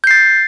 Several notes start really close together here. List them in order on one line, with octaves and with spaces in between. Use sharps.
G6 C7 A6